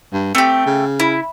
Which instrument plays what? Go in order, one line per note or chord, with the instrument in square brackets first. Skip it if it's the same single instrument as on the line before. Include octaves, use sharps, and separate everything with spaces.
[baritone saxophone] G2
[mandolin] A3 G4 [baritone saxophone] C4
[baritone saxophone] C#3
[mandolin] E4